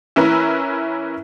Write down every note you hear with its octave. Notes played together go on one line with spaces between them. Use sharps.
E3 C#4 E4 A#4 B4